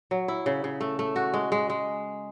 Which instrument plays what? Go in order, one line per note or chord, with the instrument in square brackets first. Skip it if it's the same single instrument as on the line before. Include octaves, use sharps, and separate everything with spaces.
[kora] F#3
E4
C#3
C#3
A3
A3
F#4
G#3
G#3
G#3